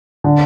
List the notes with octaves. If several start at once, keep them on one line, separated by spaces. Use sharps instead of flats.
D3